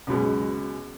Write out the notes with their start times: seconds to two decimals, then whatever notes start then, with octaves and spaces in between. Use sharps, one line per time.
0.07 C#2 F#2 B2 G#3